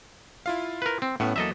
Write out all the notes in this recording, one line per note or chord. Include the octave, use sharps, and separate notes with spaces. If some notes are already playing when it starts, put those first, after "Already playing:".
E4 F4 F5
A#4 B4
C4
A2 B3 C#4 F#5
E2 F#3 A#3 A4 D#5 E5